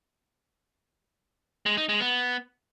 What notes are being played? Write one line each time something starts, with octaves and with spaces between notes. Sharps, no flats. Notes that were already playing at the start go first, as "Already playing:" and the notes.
G#3
D#4
G#3
B3